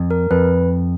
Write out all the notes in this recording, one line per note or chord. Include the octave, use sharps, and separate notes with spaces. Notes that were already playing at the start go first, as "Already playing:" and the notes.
Already playing: F2
A#4
F2 B4